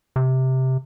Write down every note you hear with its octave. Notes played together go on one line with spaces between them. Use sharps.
C3